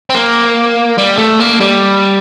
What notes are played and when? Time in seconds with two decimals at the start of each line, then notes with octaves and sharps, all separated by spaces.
0.10 C4
0.14 A#3
0.98 G3
1.18 A3
1.40 A#3
1.61 G3